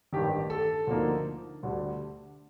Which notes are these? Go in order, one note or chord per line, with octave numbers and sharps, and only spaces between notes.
A1 G2 D#3 G4
A4
D2 D3 F3 A#3 D#4
D2 D3 G3 D4